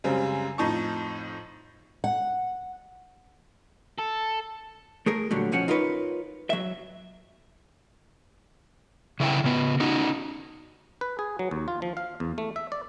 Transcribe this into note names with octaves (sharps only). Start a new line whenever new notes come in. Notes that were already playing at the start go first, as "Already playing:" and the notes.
F#2 C#3 G3 G#3 C4
F2 A2 D#4 A5 C#6
F#5
A4
A3 G#4 A#4
A#2 D3 F#3 G3 A3
B1 F3 C#4 F#5
D#4 F4 A#4 B4 C#5
F#3 E5
C#3 E4 D#5 G5
C#3 B3
C#4 D#4 F#4
B4
G#4
F#3
D#2
F4
F3
F5
E2
A3
E5
D5